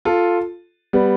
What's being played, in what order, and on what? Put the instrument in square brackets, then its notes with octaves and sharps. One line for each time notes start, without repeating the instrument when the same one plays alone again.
[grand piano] F4 A4
G3 B3